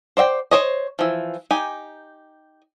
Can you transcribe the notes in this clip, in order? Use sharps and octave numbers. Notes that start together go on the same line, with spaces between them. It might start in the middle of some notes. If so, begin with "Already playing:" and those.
C5 D5 E5 G5
C5 C#5 D#5
E3 F3
D#4 G4 G#5